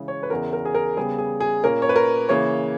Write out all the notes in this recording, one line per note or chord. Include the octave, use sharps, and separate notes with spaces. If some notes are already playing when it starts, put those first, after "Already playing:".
Already playing: C#3 E3 G#3
C#5
B4
E2 C#3 E3 A#4
A#4
G#4
A#4
C#3 G3 B3 G#4
G#4
G#4
A#2 A#3 C#4 A#4
C#5
B4
A#4
C#3 E3 A#3 C#5